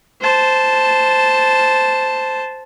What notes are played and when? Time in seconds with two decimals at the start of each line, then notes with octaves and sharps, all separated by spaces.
0.22 C5 A5